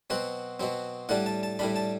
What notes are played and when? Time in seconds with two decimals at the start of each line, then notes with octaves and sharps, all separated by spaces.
0.10 B2 F#3 C4 F#5
0.60 B2 F#3 C4
1.09 A2 G3 D4 F#5
1.26 A5
1.43 A5
1.59 A2 G3 D4 B5
1.76 A5